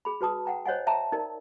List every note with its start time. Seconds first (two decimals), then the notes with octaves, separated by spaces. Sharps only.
0.05 G#4 B5
0.21 F#4 B4 A5 D#6
0.45 F#5 G5 A#5
0.66 C5 C#5 D#5 F#5 G#5
0.87 E5 G5 A5 A#5
1.12 D#4 A#4 D5